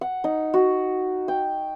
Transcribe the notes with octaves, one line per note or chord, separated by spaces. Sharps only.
F#5
D#4
F#4
G5